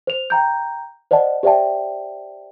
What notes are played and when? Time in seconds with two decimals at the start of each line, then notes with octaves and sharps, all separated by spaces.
0.07 C5 F7
0.30 G5 A#5 G6
1.11 C5 D5 D#5 F#5 A5
1.43 G4 C5 D5 E5 G5 A5